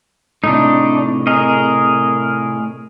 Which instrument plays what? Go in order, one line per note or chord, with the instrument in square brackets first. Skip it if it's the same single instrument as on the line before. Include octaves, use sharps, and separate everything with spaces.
[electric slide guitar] A2 C3 [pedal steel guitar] D4 D#4
[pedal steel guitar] G#4 A#4 D#5